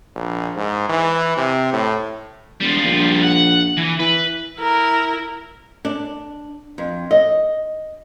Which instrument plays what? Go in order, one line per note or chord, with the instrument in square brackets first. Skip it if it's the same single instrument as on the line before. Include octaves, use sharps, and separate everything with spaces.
[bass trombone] A#1
G#2
E3
C3
A2
[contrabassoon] E1 [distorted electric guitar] G3 F4
[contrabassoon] A#1
[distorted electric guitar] F#5
E3
[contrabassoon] E3 [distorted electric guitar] B4
[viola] E4 A#4
[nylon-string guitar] D4
F2
D#5